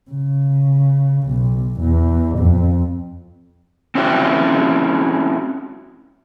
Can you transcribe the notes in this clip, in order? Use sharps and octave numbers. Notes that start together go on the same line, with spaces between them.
C#3
B1
E2
F2
C4 C#4 E4 F#4 G5